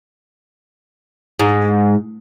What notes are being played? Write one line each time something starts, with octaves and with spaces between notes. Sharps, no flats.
G#2